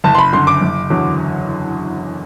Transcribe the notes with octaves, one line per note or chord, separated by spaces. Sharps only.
F#1 A5
C6
B5
F#2 D3 C6
D6
F#1
E2 D3 F#3